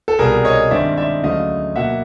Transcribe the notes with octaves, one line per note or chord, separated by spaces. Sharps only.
A4
C2 B2 G3 G#4 A#4
C#5 D#5
G2 D#3 G#3 C4 D5 E5
D5 E5
D2 C#3 F#3 A3 D#5 F5
B2 F#3 A#3 E5 F#5